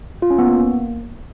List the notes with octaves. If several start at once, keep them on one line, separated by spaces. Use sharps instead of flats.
F4
C#4
B3
A#3